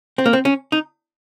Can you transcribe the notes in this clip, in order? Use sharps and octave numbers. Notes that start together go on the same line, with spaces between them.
C4
A#3
C4
C#4
D#4